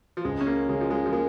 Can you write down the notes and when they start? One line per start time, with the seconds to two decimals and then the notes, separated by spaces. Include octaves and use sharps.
0.17 F3
0.25 C#2 G#3
0.41 C#4
0.47 A#3
0.69 C#3 G#3
0.81 F3
0.90 G#3
1.06 F3
1.12 G#3 A#3